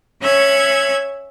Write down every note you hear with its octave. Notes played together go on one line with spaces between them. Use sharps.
C#4 C#5 E5 F#6 G#6